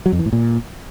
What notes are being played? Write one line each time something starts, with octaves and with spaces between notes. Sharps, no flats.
F#3
F2
E3
A2
A#2